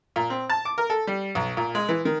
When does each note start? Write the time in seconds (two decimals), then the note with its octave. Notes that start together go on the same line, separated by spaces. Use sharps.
0.16 A#2
0.30 C4
0.50 A5
0.65 D6
0.78 A#4
0.90 A4
1.07 G3
1.35 B1
1.57 A#2
1.75 G#3
1.89 E3
2.05 D#3